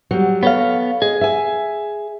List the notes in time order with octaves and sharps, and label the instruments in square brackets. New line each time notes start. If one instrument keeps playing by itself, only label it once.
[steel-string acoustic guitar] F#3 G3
[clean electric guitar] B3 A4 F5 [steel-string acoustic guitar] C#5
[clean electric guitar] G#4 [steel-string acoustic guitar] D#5
[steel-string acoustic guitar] E5 G#5